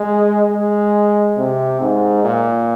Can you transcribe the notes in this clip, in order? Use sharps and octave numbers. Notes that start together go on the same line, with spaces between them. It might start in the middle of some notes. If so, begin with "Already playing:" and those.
Already playing: G#3
G#3
C3
G#2
A#2